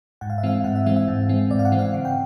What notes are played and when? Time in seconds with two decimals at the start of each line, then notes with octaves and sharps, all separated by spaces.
0.21 G#2 F#5
0.30 F5
0.38 E5
0.43 E3 G#3 C4 F5
0.64 G#2 F#5
0.75 E5
0.86 E3 G#3 C4 E5
0.96 E5
1.08 G#2
1.29 E3 G#3 C4
1.50 G#2 D5
1.59 F5
1.65 F#5
1.72 E3 G#3 C4
1.79 F5
1.93 C#3 F#5
2.05 G5